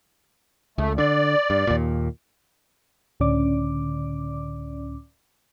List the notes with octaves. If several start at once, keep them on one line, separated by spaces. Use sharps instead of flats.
C#2 A3
D3 D5
G2
D#2 A#2
C#2 A2 D3 C#4 D5 D6